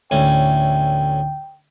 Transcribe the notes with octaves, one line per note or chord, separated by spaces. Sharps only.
D2 A2 C#4 G5